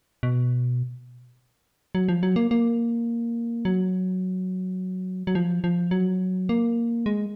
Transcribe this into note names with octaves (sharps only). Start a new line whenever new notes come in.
B2
F#3
F3
F#3
A#3
A#3
F#3
F#3
F3
F3
F#3
A#3
G#3